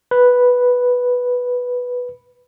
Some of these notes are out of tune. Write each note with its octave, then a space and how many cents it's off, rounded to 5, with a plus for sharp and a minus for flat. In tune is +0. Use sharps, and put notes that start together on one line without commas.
B4 -5